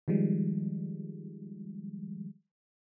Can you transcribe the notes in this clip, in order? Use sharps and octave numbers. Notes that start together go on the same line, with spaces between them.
D#3 F3 G3 G#3